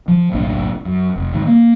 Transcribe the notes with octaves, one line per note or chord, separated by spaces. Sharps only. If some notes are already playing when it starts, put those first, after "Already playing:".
F3
F#1 B1 A2 D4
F#2
F1
G#2 D#3
A#3